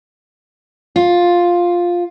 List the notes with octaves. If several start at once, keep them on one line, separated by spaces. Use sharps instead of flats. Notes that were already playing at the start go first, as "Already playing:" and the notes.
F4